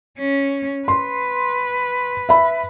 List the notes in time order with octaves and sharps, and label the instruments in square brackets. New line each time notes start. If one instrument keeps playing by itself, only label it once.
[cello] C#4
[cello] B4 [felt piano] C6
[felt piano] E5 B5